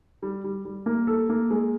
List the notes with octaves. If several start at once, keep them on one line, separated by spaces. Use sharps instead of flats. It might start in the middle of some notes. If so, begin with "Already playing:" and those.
G3
G3
G3
A#3
A4
A#3
G#3